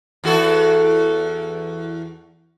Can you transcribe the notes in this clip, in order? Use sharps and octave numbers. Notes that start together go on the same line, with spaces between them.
E2 F#4 A4